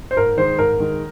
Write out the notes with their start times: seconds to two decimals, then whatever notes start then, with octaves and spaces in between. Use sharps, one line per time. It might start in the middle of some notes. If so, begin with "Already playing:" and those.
0.11 C5
0.16 G#2 A#4
0.37 D#3 G#3 C5
0.58 G#2 A#4
0.80 D#3 G#3